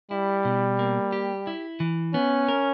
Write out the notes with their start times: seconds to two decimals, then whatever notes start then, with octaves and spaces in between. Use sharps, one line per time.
0.11 G3 E4
0.45 B2
0.79 A#3
1.13 G4
1.47 E4
1.80 E3
2.14 B3 C#4
2.48 A#4